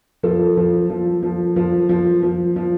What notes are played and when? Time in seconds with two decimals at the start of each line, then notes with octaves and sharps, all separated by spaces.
0.23 F3 A4
0.57 F3
0.90 F3
1.23 F3
1.56 F3
1.89 F3
2.23 F3
2.56 F3